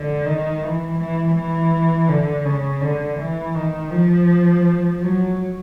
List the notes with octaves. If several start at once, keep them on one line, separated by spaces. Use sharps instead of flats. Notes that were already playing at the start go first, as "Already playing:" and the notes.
Already playing: D3
D#3
E3
E3
E3
D3
C#3
D3
E3
D#3
F3
F#3